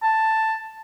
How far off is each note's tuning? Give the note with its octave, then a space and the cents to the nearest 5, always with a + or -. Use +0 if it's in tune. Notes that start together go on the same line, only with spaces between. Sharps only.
A5 +5